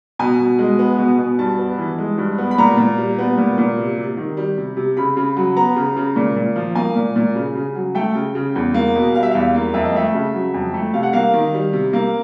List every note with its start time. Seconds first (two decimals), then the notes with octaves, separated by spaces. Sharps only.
0.19 B2 G#5
0.39 B2
0.59 G#3
0.79 B3
0.99 B2
1.19 B2
1.39 G2 A5
1.59 B3
1.79 E3
1.98 G#3
2.18 G2
2.38 B3
2.51 B5
2.58 A#2 A#5
2.77 A#2
2.98 G3
3.18 B3
3.38 A#2
3.58 A#2
3.77 C3
3.98 C3
4.17 D#3
4.37 G3
4.58 C3
4.77 C3
4.97 C#3 B5
5.17 C#3
5.37 F#3
5.57 B3 A#5
5.76 C#3
5.97 C#3
6.16 A#2
6.36 A#2
6.56 F3
6.75 A#3 G#5
6.96 A#2
7.16 A#2
7.36 C#3
7.55 C#3
7.76 F#3
7.95 A3 G5
8.15 C#3
8.35 C#3
8.56 E2
8.74 A#3
8.95 B2
9.15 G3 F5
9.23 E5
9.31 E2 F5
9.55 A#3
9.74 F2 E5
9.85 D#5
9.94 A3 E5
10.14 C#3
10.34 F#3
10.54 F2
10.74 A3
10.94 C3 F5
11.03 F#5
11.13 A#3 F5
11.34 D#3
11.54 G3
11.73 C3
11.93 A#3